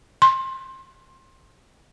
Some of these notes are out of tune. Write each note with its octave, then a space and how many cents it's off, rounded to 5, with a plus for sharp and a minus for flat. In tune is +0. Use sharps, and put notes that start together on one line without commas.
C6 +20